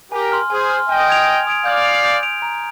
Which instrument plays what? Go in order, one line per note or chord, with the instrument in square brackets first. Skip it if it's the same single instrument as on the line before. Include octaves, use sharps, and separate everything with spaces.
[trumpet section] G4 A#4 [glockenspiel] G#5
[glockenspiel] C6 F6
[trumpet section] G#4 C5 [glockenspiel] G#5
[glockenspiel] C6 F6
[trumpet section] D#5 G5 [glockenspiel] G#5
[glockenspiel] D#6 G#6 D7 F7
G#5
D#6 G#6 D7 F7
[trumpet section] D5 F5 [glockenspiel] G6
[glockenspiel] D7 F7
G6
D7 F7
A#5